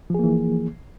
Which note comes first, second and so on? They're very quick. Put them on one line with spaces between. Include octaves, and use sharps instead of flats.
F3 G#4 A#3 E3